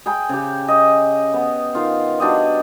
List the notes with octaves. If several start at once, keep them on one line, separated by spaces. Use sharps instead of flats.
G#4 G5 B5
C#3 G4
D#5
B3
D#3 F4 F5
F#3 D4 G4 D#5